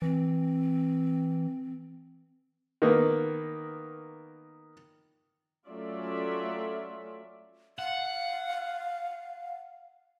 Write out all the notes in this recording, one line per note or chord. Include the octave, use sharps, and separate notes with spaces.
E3 C4
D#3 A#3 B3
F#3 A3 C#4 F4 D5 E5
F5 F#5